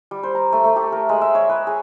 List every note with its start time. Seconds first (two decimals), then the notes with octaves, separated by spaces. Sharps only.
0.11 G3
0.23 C5
0.35 A#5
0.53 A3
0.64 A3
0.76 G4
0.92 A#4
1.09 G#3
1.21 E5
1.35 C#5
1.49 B4
1.67 G#4